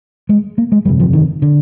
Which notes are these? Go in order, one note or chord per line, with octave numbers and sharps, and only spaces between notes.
G#3
A#3
G#3
G1 F2 C3 G3
F3
D#3
D3